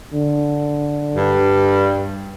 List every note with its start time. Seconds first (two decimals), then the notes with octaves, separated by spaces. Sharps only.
0.14 D3
1.16 G2